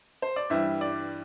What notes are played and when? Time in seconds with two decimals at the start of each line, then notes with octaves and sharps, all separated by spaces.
0.22 C5
0.36 D5
0.50 G2 E3 G3 E5
0.81 D5